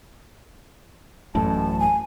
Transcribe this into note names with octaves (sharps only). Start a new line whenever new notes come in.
A1 F#2 A2 A5
G#5